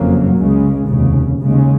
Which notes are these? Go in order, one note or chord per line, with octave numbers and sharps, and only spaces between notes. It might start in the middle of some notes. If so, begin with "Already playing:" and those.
Already playing: F#1 F2 C#3 F#3 A#3
C#2 C#3 G#3
F1 D#2 C#3
D#2 C#3 G#3